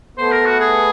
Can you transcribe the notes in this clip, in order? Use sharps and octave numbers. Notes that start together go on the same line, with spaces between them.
A3 B3 C5
A#4
F#4
G#4